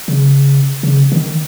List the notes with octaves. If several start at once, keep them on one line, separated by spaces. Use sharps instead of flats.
C#3
C#3
D#3